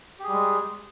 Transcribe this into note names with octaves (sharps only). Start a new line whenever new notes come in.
G3 G#3 G4 G#4